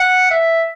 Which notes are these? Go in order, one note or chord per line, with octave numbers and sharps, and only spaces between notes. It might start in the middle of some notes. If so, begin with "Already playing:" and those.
Already playing: F#5
E5